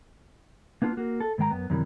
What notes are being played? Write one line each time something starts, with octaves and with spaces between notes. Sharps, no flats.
A#3 B3 D4 F4
A#3 F#4
A4
G#2 D#3 G#3 G5 A#5
F#2 B3
F#2 C3 D#3 E3 G3